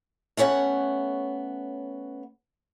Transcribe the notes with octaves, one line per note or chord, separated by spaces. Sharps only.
A3 B3 C#4 C#5 F#5